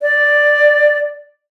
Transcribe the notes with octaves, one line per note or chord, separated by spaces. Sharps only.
D5